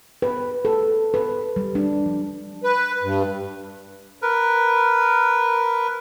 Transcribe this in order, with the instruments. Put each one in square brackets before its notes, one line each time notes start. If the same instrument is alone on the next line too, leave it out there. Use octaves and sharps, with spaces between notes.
[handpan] B4
A4
B4
G3
D4
F3
[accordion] B4
G2
[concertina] A#4 B4